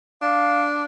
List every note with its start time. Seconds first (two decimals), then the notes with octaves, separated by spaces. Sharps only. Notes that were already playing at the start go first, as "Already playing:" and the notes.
0.22 D4 F5